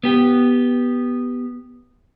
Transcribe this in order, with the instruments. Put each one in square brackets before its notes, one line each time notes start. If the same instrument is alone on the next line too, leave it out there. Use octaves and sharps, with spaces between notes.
[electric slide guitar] B3 G4